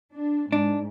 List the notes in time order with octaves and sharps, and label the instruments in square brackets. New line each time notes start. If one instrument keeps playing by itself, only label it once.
[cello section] D4
[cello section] G#2 [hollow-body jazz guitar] D4